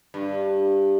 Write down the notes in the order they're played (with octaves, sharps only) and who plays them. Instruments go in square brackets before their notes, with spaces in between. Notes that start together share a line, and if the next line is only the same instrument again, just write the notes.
[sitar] G2